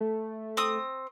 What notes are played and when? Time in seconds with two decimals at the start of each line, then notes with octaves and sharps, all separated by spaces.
0.01 A3
0.57 C4 D#6